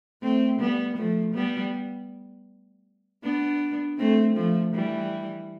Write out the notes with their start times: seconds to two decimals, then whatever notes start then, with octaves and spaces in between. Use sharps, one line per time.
0.22 A3 C4
0.60 G3 B3
0.97 F3 A3
1.35 G3 B3
3.23 B3 D4
3.98 A3 C4
4.36 F3 A3
4.74 E3 G3